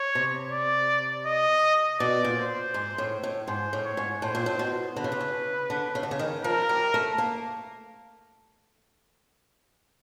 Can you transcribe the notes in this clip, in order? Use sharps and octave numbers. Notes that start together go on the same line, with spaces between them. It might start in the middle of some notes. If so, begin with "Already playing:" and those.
Already playing: C#5
C3
D5
D#5
B2 D5
A#2
C5
G#2
A2
A2
G#2 C5
A2
C#5
G#2
A2 C5
A#2
A2
B2
D3 B4
C#3
C3
C#3
D3
C#3
D3
C#3
D#3
F3 A#4
G3
A3
A#3